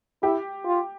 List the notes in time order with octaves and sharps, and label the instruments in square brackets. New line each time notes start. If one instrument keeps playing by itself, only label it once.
[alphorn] E4 [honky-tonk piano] G4
[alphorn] F4